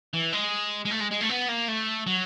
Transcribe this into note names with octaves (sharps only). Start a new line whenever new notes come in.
E3
G#3
G#3
A3
G#3
G#3
A3
B3
A#3
A3
F#3